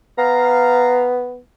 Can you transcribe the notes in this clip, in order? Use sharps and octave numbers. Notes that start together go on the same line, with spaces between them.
B3 F5 A#5